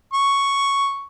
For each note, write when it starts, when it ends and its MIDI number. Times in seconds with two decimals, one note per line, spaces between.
0.14 1.06 85